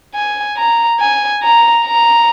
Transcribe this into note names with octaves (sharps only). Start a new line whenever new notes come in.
G#5
A#5
G#5
A#5
A#5